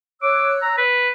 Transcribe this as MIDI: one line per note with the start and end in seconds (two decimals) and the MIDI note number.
0.22 0.81 73
0.22 0.54 86
0.22 0.81 88
0.22 0.81 90
0.62 0.76 82
0.78 1.11 71